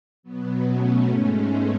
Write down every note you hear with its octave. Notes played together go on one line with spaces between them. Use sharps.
B2 F#3 B3
A3 C#4
G#2 G#3
B3